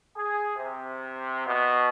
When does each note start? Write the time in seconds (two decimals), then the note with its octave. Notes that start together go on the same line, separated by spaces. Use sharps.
0.16 G#4
0.56 C3
1.45 B2